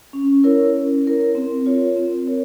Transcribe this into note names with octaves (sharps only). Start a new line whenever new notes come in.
C#4
E4 A#4 C#5
C#4
E4 A#4 C#5
C4
F4 A#4 C#5
C4
A#4 C#5